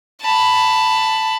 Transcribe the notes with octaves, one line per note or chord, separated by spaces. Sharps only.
A5 B5